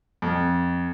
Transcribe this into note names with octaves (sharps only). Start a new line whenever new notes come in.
F2